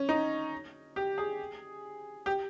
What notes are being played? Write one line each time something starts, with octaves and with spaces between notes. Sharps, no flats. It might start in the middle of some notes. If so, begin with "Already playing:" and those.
Already playing: C#4
D#4
G4
G#4
G4